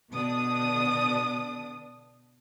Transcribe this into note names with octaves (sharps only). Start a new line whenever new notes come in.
B2 D3 D4 D#6